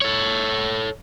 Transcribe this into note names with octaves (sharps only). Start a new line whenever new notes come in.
A4 C#5